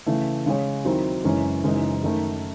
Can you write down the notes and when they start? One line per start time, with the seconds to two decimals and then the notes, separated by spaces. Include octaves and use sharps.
0.06 C#3 E3 A3
0.46 C#3 G#3 C#4 G#4 C#5
0.85 D#2 D#3 F#3 C4 E4
1.24 F#1 F#2 E3 G#3 C#4
1.63 F#1 F#2 E3 G#3 D#4
2.03 F#2 D#3 A3